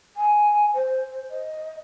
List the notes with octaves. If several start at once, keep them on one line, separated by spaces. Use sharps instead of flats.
G#5
C5
D#5